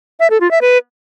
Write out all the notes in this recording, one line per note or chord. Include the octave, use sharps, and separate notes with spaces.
E5
A4
F4
E5
B4